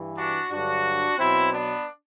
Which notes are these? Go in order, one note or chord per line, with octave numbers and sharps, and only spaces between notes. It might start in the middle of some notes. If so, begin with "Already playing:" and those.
Already playing: G2 E3
D4 F#4
G2 D3 F#3 D4 F#4
B2 F#3 C4 E4
B3 D4